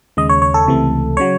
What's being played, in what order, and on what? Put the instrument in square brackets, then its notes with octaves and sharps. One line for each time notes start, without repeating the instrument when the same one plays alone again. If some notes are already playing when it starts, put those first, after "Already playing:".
[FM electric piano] D#2 C#3 G#3 D#5
C#5
C#5
A4
C#2 C3 E3 A3
C#3 F#3 C#5